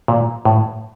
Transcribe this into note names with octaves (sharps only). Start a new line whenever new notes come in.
A#2
A2